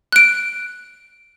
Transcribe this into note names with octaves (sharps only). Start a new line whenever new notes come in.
F#6 D7